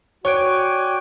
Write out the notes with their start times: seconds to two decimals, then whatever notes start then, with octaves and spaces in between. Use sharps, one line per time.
0.25 F#4 C#5 D5 G5 G#5 C#6 F#6 D7